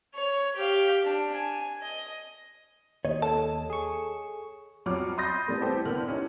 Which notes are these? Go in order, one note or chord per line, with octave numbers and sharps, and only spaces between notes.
C#5
G4 F5
D4
G#5
D#5
D#2 C#5 D#5
A4 A5
G#4 C#6
F2 F#3 G3 C#5 D6 F6
B5 C6 D#6 G6 A6 A#6
E3 G3 A3 C4
E3 A3 C4 G4 A4 C5
D3 A#3 B3 E4 F6 F#7
C#4 D#4 E4 G4